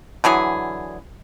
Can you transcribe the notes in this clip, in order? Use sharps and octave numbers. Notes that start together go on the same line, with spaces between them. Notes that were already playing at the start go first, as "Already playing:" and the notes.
D3 E3 F#3 G#4